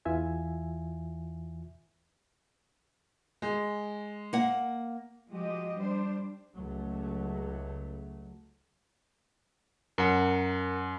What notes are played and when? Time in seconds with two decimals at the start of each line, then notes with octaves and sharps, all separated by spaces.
0.05 E2 E3 F4 E5 G#5
3.42 G#3
4.33 A#3 F#5
5.29 F3 G#3 F#4 G4 D#5
5.76 G3 D4 C5
6.56 C#2 F#3 A3
9.98 F#2 A#4 F#5